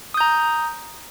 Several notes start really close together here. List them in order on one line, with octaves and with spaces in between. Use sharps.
D#6 G6 A#5